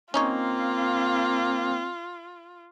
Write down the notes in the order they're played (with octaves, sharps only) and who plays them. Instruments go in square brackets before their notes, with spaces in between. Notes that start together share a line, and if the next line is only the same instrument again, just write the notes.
[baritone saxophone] A#3 [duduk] C4 [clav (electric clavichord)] C#4 D#4 C#5 [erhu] F4